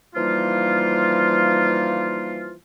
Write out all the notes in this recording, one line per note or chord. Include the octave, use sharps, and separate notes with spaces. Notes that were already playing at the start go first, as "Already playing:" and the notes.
E3 F3 G3 A#3 D#4 F4